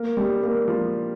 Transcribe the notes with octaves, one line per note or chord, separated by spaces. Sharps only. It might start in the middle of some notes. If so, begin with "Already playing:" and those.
Already playing: A#3
G3
A#3
F3